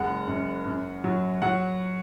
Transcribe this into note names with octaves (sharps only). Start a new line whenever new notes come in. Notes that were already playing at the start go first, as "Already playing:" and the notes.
Already playing: F#1 G#3 F#5
F#2
F#2
F#3
F#3 F#5